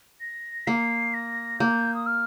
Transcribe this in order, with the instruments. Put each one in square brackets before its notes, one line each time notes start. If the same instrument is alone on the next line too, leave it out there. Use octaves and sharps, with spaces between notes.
[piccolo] A#6
[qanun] A#3 [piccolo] C7
[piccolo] A#6
[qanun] A#3 [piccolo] G6
[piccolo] D#6
F6